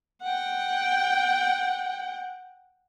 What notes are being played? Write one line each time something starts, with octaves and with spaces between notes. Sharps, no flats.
F#5 G5